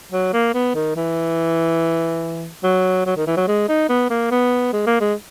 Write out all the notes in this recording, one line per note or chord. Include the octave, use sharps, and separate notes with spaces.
F#3
A#3
B3
D#3
E3
F#3
F#3
D#3
E3
F#3
G#3
D#4
B3
A#3
B3
G#3
A#3
G#3